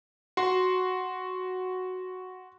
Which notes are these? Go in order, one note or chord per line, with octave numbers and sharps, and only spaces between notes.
F#4 C6